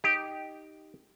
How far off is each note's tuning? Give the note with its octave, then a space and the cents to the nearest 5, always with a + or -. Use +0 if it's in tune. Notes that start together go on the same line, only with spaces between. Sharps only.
D#4 +0 G4 +0